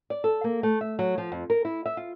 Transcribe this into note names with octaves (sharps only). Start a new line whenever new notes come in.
D5
A4
A#3
A3
E5
F#3
F3
F2
A#4
E4
E5
F4